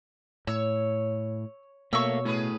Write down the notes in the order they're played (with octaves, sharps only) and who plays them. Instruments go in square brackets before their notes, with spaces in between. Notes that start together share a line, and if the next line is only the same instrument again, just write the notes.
[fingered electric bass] A2 [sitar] C#5 [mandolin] E6
[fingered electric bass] B2 [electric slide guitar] A3 A#3 [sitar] C#5 [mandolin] C#6 E6
[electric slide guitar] A2 [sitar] C#4 G#4 B4